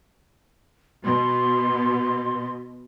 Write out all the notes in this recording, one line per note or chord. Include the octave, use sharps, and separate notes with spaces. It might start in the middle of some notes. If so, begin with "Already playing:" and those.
B2 C6